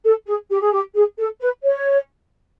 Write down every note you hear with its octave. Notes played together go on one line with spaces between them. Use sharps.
A4
G#4
G4
G#4
G4
G#4
A4
B4
C#5